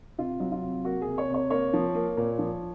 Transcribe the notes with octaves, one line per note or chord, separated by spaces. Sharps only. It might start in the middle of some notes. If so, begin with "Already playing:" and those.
C3 F4
F#3
F4
C3
A#3 F#4
G#4
C3
C#5
C3 C#5
A#3 C#5
F3
A#3
A#2
F3